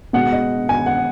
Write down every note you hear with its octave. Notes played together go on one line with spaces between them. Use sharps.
B2 G#3 F#5
D#5
G#5
F#5